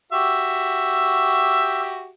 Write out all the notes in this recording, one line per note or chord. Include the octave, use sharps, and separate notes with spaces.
F#4 G4 E5